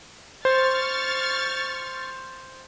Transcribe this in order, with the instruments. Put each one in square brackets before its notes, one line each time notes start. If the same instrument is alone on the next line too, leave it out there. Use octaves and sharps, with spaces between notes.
[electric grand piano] C5 [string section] C#6 F6 A6